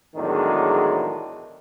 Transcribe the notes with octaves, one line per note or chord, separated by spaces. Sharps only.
E2 A2 D#3 F#3 G#3 D4